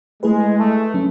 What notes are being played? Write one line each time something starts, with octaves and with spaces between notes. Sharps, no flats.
G#3 A3 E4 G#4 B4
A3
F#3 A3 C#4